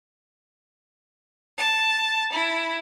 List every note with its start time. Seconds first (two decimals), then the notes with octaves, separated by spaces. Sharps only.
1.57 A5
2.32 E4